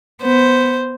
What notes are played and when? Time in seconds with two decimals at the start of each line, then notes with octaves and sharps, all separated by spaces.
0.22 B3 C5